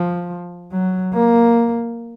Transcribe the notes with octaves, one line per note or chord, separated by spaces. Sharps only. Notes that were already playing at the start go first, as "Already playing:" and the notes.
Already playing: F3
F#3
A#3